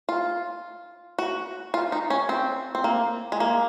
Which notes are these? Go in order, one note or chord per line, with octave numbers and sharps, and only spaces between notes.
F4
F#4
F4
D#4
C#4
C4
C4
A#3
G#3
A#3